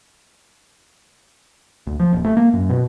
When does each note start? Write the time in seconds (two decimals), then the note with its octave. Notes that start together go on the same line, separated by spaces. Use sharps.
1.87 D2
2.00 F3
2.13 D#1
2.25 A3
2.37 A#3
2.53 F#2
2.69 B2